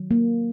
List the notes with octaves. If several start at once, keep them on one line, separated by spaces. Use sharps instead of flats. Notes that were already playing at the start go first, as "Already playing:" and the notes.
Already playing: D#3 F#3
A#3